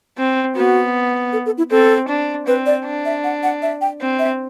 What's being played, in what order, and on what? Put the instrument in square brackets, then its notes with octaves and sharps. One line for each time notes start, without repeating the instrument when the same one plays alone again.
[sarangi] C4
[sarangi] B3 [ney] F#4
[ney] A4
A4
E4
[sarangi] C4 [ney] A4
[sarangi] D4
[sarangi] C4 [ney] B4
[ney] D5
[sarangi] D4
[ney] E5
F#5
F#5
E5
G5
[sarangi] C4
[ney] E5